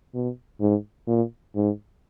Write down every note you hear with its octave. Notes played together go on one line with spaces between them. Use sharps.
B2
G#2
A#2
G#2